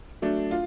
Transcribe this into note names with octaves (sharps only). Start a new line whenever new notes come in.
F#3 A3 D4
F4